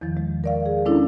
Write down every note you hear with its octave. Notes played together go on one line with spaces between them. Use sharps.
E2 D#3 F3
G#3
A#4 D5 F5
G#4
G#3 C#4 D4 E4 A4